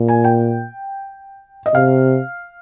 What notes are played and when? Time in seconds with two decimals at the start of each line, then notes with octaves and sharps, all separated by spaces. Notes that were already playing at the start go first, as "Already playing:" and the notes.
Already playing: A#2
0.08 G#5
0.24 G5
1.66 D#5
1.74 C3 F5